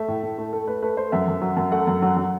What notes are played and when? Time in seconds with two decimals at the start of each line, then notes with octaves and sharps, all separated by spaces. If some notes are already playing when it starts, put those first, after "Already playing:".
Already playing: A3 E5
0.08 A2
0.23 A2
0.38 A3
0.53 A3 A4
0.67 A3 B4
0.82 A3 B4
0.97 A3 C5
1.12 F#2 E5
1.28 F#2
1.42 F#3
1.57 F#2
1.72 A3 F#5
1.87 F#2
2.02 F#3
2.17 F#3